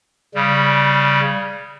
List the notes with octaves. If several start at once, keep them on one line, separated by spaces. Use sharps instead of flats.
C#3 G3